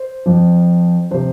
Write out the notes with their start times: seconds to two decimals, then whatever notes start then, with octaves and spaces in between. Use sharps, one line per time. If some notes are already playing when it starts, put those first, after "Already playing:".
Already playing: C5
0.26 F2 F3
1.11 C3 F3 C5